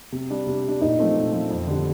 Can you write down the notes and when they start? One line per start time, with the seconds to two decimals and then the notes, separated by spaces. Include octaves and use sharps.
0.12 C3
0.30 G3 D4
0.47 C3
0.64 G3 D4
0.81 A#2 D#4
0.99 F3 A3 C4
1.17 A#2
1.33 F3 A3 C4
1.50 F2
1.67 D3 G3 D4